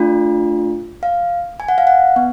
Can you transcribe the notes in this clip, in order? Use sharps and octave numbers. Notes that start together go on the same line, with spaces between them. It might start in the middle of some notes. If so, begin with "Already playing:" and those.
Already playing: A3 D4 F4
F5
G#5
F#5
F5
F#5
B3